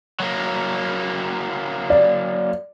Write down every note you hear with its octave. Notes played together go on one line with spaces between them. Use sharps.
F#3 A#3
D5